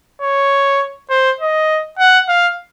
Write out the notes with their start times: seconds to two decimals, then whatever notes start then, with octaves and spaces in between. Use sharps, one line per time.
0.22 C#5
1.10 C5
1.40 D#5
1.99 F#5
2.29 F5